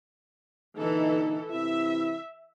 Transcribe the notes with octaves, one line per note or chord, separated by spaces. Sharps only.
A#2 D3 E3 D#4 A4
C3 E3 E4 E5